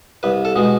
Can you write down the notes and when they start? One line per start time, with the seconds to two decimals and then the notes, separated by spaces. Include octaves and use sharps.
0.23 C2 B4
0.45 A4
0.56 B2 G#3